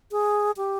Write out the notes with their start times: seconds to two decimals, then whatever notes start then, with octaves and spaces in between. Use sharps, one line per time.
0.11 G#4
0.57 G4